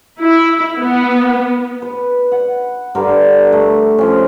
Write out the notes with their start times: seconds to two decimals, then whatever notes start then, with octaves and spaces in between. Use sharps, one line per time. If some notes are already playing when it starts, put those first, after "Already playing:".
0.19 E4
0.80 B3
1.82 B4
2.32 F#5
2.95 G2 D3 G4 A#4
3.52 A3
3.99 F3 C#4